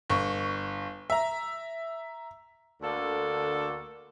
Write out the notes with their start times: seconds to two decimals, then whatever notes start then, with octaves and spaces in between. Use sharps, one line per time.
0.10 G1 C#6
1.10 E5 A#5
2.82 D2 D3 A#3 A4